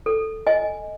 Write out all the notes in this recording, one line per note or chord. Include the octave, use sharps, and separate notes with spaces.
A4
D#5 G#5